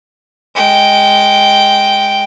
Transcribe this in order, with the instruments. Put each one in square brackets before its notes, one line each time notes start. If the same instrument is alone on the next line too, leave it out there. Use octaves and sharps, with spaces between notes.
[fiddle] G#3 G5